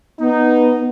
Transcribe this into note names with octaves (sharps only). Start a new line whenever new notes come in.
B3 D#4